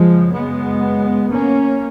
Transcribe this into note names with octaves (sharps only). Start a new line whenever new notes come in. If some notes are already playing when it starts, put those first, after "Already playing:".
Already playing: F#2 C#3 F3 G#3
G#3 B3
A#3 C#4